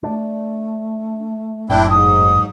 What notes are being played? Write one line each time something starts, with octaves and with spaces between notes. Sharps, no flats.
A3 D4
F#1 A2 F#3 C4 D4 E4 G5
G#2 D#6